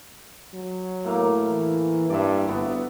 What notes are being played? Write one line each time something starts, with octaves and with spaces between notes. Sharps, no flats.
F#3
A2 A#3 F5
E3
G2 D5 E5
G1 B3 F#4